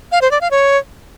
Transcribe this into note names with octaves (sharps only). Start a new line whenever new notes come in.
F5
C5
D5
F5
C#5